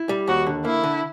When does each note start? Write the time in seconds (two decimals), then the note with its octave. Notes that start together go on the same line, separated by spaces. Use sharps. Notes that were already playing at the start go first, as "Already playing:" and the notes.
Already playing: E4
0.09 G3
0.27 D#2 F#4
0.47 D3
0.65 A#3 E4
0.84 D3